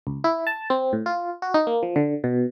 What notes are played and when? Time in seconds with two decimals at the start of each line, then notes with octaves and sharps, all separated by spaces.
0.07 C#2
0.24 E4
0.47 A5
0.70 C4
0.93 A2
1.06 F4
1.42 F#4
1.54 D#4
1.67 A#3
1.83 F3
1.96 D3
2.24 B2